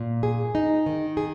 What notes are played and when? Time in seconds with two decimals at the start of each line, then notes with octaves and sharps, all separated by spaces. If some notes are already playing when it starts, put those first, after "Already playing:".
Already playing: A#2
0.23 G#4
0.55 D#4
0.86 D#3
1.17 G#4